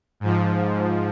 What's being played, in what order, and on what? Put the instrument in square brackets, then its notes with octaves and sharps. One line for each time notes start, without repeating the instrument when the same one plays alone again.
[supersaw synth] G#2 F3